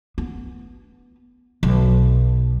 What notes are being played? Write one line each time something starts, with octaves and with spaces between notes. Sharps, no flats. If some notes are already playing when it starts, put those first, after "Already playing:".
B3
B1